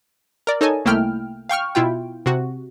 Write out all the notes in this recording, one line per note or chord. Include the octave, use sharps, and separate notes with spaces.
A#4 D5
D#4 A4 C#5 D#5 G#5 A5
C2 A3 A#3 E4 G5 F6
F5 G5 C#6 F6
B2 E4 F4 G5
C3 F#4